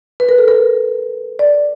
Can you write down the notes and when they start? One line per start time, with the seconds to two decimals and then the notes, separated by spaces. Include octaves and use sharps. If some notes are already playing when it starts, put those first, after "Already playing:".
0.20 B4
0.29 A#4
0.38 A4
0.48 A#4
1.39 D5